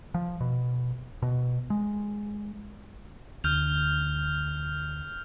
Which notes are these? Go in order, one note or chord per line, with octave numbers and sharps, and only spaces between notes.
F3
B2
B2
G#3
D2 F6 G6 F7